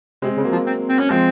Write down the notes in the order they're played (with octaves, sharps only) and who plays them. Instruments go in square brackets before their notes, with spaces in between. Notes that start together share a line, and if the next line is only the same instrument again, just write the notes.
[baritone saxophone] C3 [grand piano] G#3 C4
[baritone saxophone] C#3
[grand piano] F#3 A#3
[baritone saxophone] F3
C4
C4
C#4
[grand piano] F3 G#3 [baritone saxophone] C4